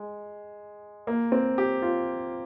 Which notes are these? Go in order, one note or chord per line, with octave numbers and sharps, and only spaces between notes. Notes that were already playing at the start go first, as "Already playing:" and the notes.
Already playing: G#3
A#3
C4
G4
F4